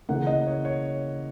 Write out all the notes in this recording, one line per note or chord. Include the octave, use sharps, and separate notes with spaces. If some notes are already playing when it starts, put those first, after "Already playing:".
C#3 E3 A#3 F#5
D#5
C#5
C#5